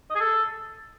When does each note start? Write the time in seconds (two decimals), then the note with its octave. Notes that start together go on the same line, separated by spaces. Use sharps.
0.10 D#5
0.15 G#4
0.20 A4